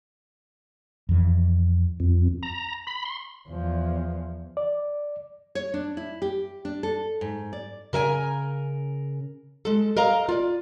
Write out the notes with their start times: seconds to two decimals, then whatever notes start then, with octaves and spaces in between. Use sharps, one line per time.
1.09 F2 E3
2.00 F2
2.43 A#5
2.87 B5
3.05 C6
3.49 E2 F3
4.57 D5
5.55 C#5
5.74 D4
5.97 E4
6.22 G4
6.65 D4
6.83 A4
7.21 G#2
7.53 D5
7.93 C#3 A#4 E5 G#5
9.65 G#3 A4
9.97 A#4 D#5 F5 A#5
10.29 F4 D5